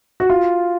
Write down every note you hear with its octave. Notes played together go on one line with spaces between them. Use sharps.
F#4
F4